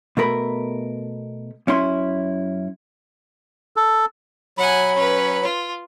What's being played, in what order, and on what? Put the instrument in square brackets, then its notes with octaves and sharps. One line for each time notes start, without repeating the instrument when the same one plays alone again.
[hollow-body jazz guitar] B2 A3 A#4 B5
F#2 C#4 E4 C6
[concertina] A4
[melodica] F#3 B5 [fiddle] F#5 G#5
[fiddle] C#4 B4
F4